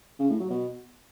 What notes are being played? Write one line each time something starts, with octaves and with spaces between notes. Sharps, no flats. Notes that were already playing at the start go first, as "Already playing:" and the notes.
C#3
A2
F#3
B2